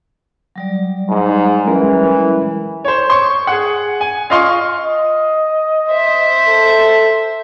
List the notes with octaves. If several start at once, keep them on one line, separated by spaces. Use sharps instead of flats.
F#3 G3 D5
G#2
E3 G#3 C#4 A#4
C5 C#5
C6 C#6
G#4 F#5
G#5
F4 D#5 F5 C6 C#6
D#5
C5 E5
A4